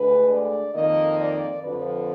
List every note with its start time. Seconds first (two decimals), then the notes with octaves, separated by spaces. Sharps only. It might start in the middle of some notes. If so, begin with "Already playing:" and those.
Already playing: D2 D3 G#3 B4
0.30 D5
0.74 F2 D#3 A#3 D#5
1.19 D5
1.63 F2 D3 F3 B4